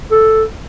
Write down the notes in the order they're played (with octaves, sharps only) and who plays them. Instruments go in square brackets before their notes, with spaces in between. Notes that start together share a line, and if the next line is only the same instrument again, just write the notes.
[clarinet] A4